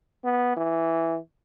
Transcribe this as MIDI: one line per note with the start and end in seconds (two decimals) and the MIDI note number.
0.24 0.54 59
0.57 1.18 52